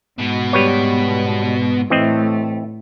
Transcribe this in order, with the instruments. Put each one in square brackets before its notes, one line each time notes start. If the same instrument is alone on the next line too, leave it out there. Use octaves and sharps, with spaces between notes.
[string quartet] G#2 [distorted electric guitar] B2 B3
[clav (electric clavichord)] G3 B4 C#5
[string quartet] A2 A3 [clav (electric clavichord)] E3 C4 D#5